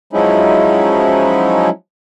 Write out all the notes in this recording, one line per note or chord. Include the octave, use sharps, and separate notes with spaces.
F3 F#3 G#3 C#4 D#4 E4